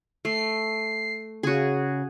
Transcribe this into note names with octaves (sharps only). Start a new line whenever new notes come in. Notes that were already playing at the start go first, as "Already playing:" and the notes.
A3 C7
C#3 F#4 G#4